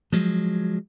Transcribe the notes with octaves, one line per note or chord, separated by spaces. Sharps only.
F3 F#3 G#3